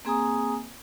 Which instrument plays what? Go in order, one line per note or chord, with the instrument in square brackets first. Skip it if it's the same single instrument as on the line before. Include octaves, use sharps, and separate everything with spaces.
[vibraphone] A#3 C4 G#4 G#5 A#5 D#6